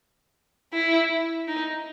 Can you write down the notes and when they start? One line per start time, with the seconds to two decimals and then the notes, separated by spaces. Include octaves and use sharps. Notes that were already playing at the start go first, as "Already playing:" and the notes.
0.74 E4
1.48 D#4